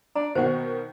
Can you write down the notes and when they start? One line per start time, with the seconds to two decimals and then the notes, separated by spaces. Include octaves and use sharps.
0.16 D4 A#5
0.35 B2 D#3 F#4 C5 F#5 G5